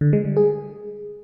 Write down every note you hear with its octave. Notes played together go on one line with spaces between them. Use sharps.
D3
G#3
G3
G#4